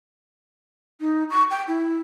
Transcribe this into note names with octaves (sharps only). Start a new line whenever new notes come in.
D#4
C#6
G5
E4